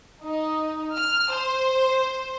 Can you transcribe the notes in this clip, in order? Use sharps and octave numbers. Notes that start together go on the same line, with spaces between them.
D#4
F6
C5